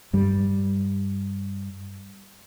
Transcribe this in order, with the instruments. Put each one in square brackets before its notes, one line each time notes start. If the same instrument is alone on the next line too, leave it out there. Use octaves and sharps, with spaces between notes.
[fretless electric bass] G2 G3